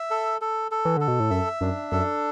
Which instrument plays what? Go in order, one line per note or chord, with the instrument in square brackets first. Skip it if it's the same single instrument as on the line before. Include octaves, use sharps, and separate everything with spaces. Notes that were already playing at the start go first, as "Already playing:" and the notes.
Already playing: [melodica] E5
A4
A4
A4
[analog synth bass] E3
[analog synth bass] D3 [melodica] A4
[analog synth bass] B2
A2
[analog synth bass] F#2 [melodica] E5
[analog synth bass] F#2 [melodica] D4
[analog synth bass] F#2 [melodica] A4